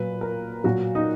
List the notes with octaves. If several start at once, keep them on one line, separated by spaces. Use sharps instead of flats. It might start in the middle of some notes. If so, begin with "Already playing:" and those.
Already playing: A#2 F#3 B4
A#4
A#2 F#3 F#4
D#4